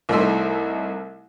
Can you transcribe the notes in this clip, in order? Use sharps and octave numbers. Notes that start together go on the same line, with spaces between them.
C2 A3 D#4 E4 E5 C6